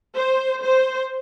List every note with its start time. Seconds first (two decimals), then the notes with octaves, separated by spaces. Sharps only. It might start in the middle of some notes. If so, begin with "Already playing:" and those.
0.15 C5
0.64 C5